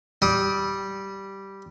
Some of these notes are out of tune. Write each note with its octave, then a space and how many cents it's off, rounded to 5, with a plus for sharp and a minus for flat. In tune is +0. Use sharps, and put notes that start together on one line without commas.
G3 -5 D#6 +35